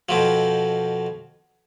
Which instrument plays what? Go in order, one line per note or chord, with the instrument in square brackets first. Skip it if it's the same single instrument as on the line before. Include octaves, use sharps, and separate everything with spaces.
[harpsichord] F2 B2 F3